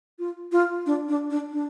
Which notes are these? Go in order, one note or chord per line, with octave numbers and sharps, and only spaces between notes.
F4
F4
D4
D4
D4
D4